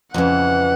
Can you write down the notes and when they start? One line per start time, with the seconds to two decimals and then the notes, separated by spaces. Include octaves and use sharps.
0.14 F2 C#3 E3 F#5